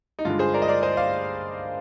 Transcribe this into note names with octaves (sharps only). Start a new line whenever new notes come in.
D#4
G2 D3 G#3 F4
G#4 C5
A#4 D5
D#5
A#4 D5
C5 D#5
D5 F5